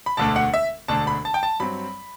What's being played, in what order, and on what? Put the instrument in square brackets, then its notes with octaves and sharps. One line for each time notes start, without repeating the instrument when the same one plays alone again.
[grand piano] B5
E1 D2 D3 A3 D4 A5
F#5
E5
E1 D2 D3 A3 D4 A5
B5
A5
G5
A5
G2 F#3 C4 B5